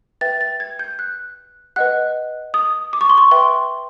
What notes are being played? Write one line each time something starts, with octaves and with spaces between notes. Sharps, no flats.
B4 E5 G5 A6
A6
G#6
G6
F#6
B4 D#5 F#5 F#6
D#6
D6
C#6
C6
C#6
B4 E5 G5 C6